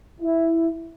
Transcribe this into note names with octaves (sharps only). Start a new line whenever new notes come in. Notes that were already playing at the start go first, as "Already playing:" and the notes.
E4